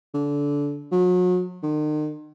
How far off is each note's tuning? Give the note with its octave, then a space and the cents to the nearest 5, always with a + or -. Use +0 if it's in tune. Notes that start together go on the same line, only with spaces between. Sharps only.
D3 -25
F#3 -35
D#3 -40